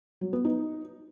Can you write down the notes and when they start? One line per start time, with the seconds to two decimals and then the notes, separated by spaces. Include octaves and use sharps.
0.21 F#3
0.33 B3
0.45 D#4